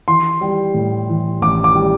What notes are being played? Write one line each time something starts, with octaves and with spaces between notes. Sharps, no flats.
E3 C6
G3
A2
E3
A1 D6
D6
G3